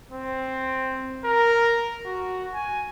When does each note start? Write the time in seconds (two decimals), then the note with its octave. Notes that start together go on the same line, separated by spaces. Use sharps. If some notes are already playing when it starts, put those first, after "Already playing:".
0.12 C4
1.25 A#4
2.05 F#4
2.54 G#5